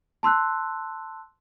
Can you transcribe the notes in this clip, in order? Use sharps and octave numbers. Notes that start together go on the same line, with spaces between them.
A5 C6 E6 F#6